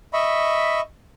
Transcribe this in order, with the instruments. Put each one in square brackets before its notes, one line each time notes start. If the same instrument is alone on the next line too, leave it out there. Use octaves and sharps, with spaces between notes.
[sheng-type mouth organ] D#5 E5 B5 C#6